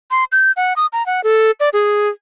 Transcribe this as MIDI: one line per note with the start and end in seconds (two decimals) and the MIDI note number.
0.11 0.24 84
0.32 0.52 91
0.57 0.73 78
0.76 0.86 87
0.93 1.05 82
1.06 1.23 78
1.24 1.51 69
1.60 1.69 74
1.73 2.09 68